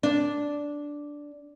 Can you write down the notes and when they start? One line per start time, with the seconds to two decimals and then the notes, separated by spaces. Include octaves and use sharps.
0.03 D4